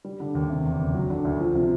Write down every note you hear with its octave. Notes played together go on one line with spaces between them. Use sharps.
G3
D3
D#2
C3
E2
F#1
F#3
D3
D2
F3
C3